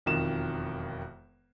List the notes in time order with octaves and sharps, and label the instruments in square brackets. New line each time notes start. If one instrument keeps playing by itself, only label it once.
[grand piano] E1 F2 D#3 E7